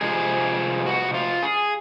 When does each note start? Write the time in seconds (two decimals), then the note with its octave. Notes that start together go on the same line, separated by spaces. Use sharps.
0.01 C3 F3 G#3 G#4
0.86 F#4
1.14 F4
1.43 G#4